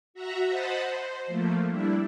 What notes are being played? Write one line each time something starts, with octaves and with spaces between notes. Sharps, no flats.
F#4 E5 F#5 A#5
C5 D#5 F#5 A5 B5
C5
F3 A3 A#3
G3 D4 E4